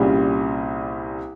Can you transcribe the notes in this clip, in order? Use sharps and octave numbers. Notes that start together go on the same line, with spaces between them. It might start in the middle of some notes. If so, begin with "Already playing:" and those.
Already playing: C2 A#2 G3 C#4 G#4